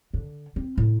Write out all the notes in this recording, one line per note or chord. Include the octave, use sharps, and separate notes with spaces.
D3
C4
A2